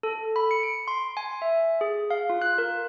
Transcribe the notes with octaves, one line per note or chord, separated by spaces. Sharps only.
A4
B5
C#7
D7
C6
G#5
E5
G#4
F5
F4
F#6
A#4